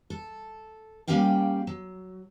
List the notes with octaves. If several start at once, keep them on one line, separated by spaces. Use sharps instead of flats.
A4
G3 A#3 C#4 G4 F5 G5
F#3